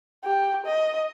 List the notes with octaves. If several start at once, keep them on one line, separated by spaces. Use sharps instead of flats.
G4
D#5